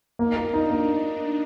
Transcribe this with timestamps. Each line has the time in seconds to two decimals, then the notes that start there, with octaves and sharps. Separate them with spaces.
0.19 A#3 D#4
0.36 A#4
0.53 D4 D#4
0.70 A#3